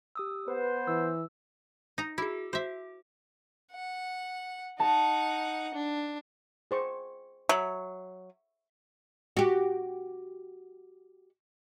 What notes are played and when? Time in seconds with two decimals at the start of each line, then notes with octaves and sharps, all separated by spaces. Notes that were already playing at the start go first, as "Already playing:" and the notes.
0.15 G4 D#6 E6
0.48 B3 B4 C5
0.87 E3 E6
1.98 D#4 A#5
2.18 E4 F#4 G#4
2.53 F#4 C5 E5
3.72 F#5
4.80 D#4 F#5 A5
5.74 D4
6.71 G#4 C5 C#6
7.49 F#3 E5 C#6
9.37 F#4 G4